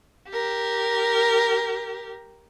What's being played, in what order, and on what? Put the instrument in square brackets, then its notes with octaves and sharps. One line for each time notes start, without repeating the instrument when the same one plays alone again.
[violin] G4 A#4